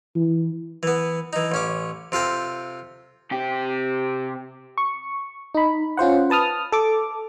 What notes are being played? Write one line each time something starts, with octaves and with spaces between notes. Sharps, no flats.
E3
E3 B3
E3 D#4
A1 C#4 D6
C3 F4 A4 G5
C3 G4
C#6
D#4 B5
C#4 F4 C5 F#5
B4 A5 D#6 F6
A4 D6